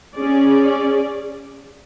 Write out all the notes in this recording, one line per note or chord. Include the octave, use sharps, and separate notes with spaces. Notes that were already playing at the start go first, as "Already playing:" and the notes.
C#4 G#4 D5